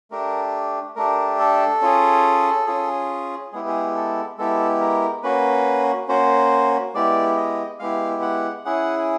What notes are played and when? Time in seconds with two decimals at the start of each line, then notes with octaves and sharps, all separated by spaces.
0.11 A3 D4 G4 A#4
0.96 A3 D4 G4 A#4
1.39 A4
1.82 C#4 F4 G#4
2.67 C#4 F4 G#4
3.52 G#3 B3 E4 G4 G#4
3.68 G#4
3.96 A4
4.38 G#3 B3 E4 G4 A4
4.81 A#4
5.23 A#3 C#4 F#4 B4
6.08 A#3 C#4 F#4 C5
6.94 G#3 B3 E4 G4 D5
7.36 D#5
7.79 G#3 B3 E4 G4 F5
8.22 F#5
8.65 C#4 E4 G#4 F#5